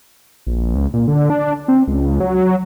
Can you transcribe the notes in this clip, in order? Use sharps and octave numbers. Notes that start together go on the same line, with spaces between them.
A#1
C#2
A#2
D3
D4
C4
C#2
F#3